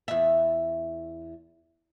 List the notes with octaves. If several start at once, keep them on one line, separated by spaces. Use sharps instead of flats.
E2 E5